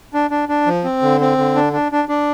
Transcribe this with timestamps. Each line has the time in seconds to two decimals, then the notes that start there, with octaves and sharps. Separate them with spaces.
0.14 D4
0.31 D4
0.49 D4
0.67 F3
0.84 C4
1.02 D3
1.21 C4
1.38 D3
1.56 D4
1.73 D4
1.92 D4
2.09 D4